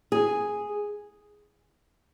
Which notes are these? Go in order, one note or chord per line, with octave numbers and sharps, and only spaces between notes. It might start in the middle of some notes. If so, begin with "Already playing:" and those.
G#4